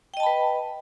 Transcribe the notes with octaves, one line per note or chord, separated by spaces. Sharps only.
B4 D#5 G5 A5 B5